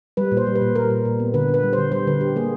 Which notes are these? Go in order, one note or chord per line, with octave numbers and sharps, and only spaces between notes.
G3 B4
A#2
C5
G3
B4
A#2
G3 A#4
A#2
A#2
B3
D3 B4
D3
B4
G3
D3 C5
G3 C5
D3 B4
D3 G4
A#3 G#4